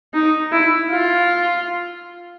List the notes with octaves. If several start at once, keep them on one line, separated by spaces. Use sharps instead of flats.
D#4
E4
F4